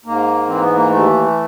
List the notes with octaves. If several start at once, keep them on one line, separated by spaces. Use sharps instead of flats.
G#2 A#3
E3 C4
B3
A#3
D#2 A3